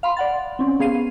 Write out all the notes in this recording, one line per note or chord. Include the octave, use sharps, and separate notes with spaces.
F5 B5 C6
D5 F#5 A6
C4 C#4
B3 G#4 F5 C7 D#7